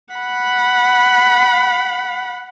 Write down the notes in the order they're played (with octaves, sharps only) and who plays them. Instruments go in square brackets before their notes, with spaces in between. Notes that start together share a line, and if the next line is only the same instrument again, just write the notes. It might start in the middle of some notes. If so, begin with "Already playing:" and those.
[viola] F#5 B5